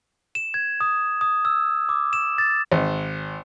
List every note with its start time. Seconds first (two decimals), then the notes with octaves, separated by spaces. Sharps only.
0.35 E7
0.54 G#6
0.81 D#6
1.21 D#6
1.45 E6
1.89 D6
2.13 E7
2.38 A6
2.71 G#1